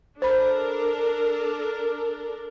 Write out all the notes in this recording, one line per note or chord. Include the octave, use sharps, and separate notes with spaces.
D4 A4 A#4 C5 B5